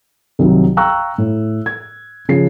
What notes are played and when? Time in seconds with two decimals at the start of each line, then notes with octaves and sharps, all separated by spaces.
0.39 C2 D#3 F#3
0.77 F5 G5 A#5 C#6 E6 F#6
1.18 A2
1.66 G#6
2.29 C#3 F3 C7